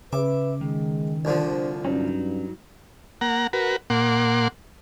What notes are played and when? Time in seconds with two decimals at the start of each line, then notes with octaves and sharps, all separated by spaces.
0.13 C#3 B4 E5 D6
0.61 D#3 G#3
1.25 C2 D3 F3 D4 C5
1.84 G2 F#3 C#4 D#4
3.21 A#3 F#5 A#5
3.53 F#4 A#4 B4
3.90 A#2 A#3 F#5 C6 D6